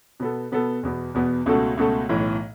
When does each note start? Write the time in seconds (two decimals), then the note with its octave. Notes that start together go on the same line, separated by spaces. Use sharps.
0.20 B2 B3 A4
0.52 B2 B3 A4
0.83 E2 B2 B3
1.14 E2 B2 B3
1.46 C#2 B2 A3 F#4 A4
1.77 C#2 B2 A3 F#4 A4
2.09 B1 A2 E3